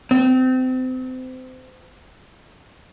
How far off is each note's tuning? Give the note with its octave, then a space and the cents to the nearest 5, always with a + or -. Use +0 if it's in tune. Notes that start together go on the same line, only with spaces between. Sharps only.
C4 -30